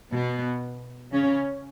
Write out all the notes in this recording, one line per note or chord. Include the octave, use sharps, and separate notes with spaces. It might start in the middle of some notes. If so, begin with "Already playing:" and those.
B2 B3
C#3 C#4